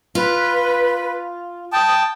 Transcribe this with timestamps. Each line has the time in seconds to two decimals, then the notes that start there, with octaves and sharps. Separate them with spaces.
0.15 F4 B4
1.73 G5 A5 D#6